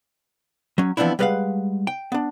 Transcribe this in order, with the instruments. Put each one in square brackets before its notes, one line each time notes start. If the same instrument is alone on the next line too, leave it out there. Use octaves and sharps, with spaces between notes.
[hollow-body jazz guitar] F#3 C#4
E3 F3 B3 C4 D4 E4
G3 G#3 B4 D5 F5 F#5
G5
B3 D4